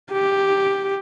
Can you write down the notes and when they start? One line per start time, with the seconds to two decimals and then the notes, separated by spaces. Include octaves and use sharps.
0.12 G4